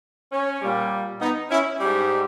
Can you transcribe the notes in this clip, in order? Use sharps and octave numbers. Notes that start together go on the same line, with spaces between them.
C#4
A#2 G3
B3 D#4
C#4 E4
G#2 G3